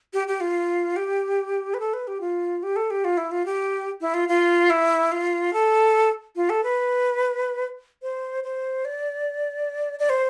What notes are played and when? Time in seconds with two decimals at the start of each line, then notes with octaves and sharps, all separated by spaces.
0.13 G4
0.28 G4
0.41 F4
0.96 G4
1.74 B4
1.80 A4
1.94 B4
2.07 G4
2.21 F4
2.63 G4
2.76 A4
2.90 G4
3.05 F4
3.17 E4
3.31 F4
3.46 G4
4.01 E4
4.14 F4
4.28 F4
4.70 E4
5.12 F4
5.53 A4
6.36 F4
6.50 A4
6.64 B4
8.02 C5
8.44 C5
8.85 D5
9.99 D5
10.10 C5